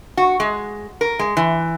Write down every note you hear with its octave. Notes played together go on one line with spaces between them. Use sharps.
F#4
G#3
A#4
G#3
E3